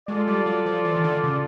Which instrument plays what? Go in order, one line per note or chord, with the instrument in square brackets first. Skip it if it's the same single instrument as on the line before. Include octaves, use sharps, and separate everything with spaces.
[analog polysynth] G#3 [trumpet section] F4 A4 D5
[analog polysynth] G3
F#3
F3
E3
D#3
D3
C#3